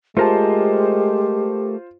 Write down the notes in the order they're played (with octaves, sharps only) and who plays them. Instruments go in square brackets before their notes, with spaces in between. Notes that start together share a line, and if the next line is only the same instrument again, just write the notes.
[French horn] G#3 [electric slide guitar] A3 A#4 A5 [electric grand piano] F4 C5 [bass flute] G4